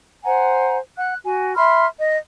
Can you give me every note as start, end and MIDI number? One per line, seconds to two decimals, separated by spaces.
0.24 0.78 72
0.24 0.78 78
0.24 0.78 80
0.24 0.78 82
0.97 1.16 78
0.97 1.16 90
1.24 1.55 66
1.24 1.55 80
1.55 1.85 76
1.55 1.85 83
1.55 1.85 84
1.55 1.85 89
1.98 2.17 75